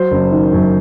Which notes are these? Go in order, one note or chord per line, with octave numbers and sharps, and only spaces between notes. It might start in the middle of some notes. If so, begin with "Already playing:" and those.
Already playing: F#3 C5
F#1
D#3
F#2